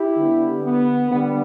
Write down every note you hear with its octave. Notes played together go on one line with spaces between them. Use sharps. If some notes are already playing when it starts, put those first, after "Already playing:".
Already playing: E4 G4
D3 G3 B3
B3
D3 G3 B3